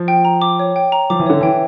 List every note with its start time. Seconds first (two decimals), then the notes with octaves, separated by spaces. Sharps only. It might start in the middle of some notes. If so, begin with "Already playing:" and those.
Already playing: F3
0.08 G5
0.25 A#5
0.42 D6
0.59 C#5
0.76 G5
0.92 A#5
1.10 F3 D6
1.19 E3
1.26 D3 C#5
1.41 E3 G5